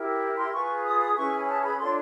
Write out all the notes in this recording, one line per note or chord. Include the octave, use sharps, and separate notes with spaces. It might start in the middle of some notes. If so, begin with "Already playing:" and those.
Already playing: E4 G4 A#4
C6
F4 G#4 B4 C#6
D#6
D#6
C#4 E4 G#4 B4 C#6
G#5
A5
B5
D4 F4 A4 C#5 C6